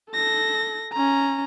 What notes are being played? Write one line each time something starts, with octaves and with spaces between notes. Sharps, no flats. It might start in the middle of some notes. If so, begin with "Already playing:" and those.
A4 A#6
C#4 A#5